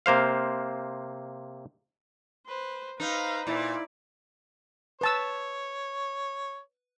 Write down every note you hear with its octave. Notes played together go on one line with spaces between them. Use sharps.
C3 A#3 C5 F5
B4 C5
D#4 B4 C5 F5
A#2 E4 D5
B4 C#5 A5 E6